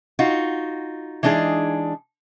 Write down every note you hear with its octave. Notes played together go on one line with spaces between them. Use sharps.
D#4 F4 F#4
E3 G#3 D4 D#4 G#4